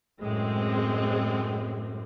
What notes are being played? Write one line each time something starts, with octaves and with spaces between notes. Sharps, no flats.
F#2 A2 G#3 C4